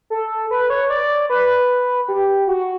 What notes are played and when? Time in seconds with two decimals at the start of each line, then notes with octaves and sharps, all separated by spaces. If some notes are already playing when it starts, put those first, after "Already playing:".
0.10 A4
0.51 B4
0.70 C#5
0.90 D5
1.30 B4
2.08 G4
2.47 F#4